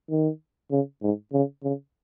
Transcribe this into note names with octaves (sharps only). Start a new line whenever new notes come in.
D#3
C#3
G#2
C#3
C#3